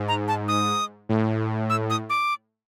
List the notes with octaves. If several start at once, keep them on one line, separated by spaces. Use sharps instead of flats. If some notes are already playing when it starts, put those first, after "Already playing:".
Already playing: G#2
A#5
A5
D#6
A2
E6
D#6
D6